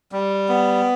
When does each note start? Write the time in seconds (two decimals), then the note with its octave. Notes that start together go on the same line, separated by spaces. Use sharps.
0.12 G3
0.49 B3